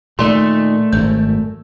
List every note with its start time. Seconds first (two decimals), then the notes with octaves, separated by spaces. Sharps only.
0.19 A#2 D#3 A3 D5 C6
0.92 G#1 F#2 G6